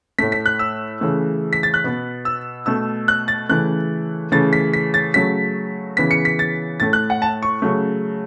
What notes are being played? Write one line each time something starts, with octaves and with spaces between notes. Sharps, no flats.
A2 A3 B6
B6
F#6
E6
C#3 E3 A3
B6
A6
F#6
B2 B3
E6
B2 A3 E6
F#6
A6
C#3 E3 A3 F#6
C#3 E3 A3 A6
B6
B6
A6
C#3 F#3 A3 B6
C#3 E3 B3 B6
C#7
B6
A6
A2 A3 A6
F#6
F#5
A5
C#6
C#3 F#3 A3